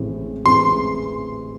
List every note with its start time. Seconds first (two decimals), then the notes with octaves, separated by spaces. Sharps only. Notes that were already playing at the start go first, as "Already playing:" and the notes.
Already playing: A1 A2 E3 G#3 C4
0.46 A1 A2 E3 G#3 C4 C6